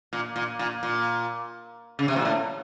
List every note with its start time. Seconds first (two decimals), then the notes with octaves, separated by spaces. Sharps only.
0.13 A#2
0.36 A#2
0.59 A#2
0.83 A#2
1.99 C#3
2.08 C3
2.16 A#2
2.25 A2